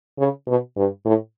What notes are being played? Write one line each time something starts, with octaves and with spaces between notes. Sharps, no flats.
C#3
B2
G2
A2